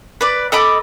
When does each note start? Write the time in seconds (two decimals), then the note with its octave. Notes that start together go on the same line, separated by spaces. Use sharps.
0.21 B4 D5
0.52 A4 D#5 B5 D6